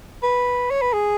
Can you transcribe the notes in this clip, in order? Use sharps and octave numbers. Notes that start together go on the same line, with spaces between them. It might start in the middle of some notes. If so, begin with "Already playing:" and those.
B4
C#5
B4
G#4